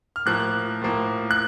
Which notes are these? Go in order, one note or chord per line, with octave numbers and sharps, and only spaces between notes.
F6
A2 F3 A#3 F#6
A2 F3 A#3
F#6